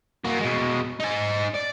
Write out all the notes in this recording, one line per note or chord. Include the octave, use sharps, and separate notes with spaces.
A#3 F#4
B2 G#3
D#4 G#5
D5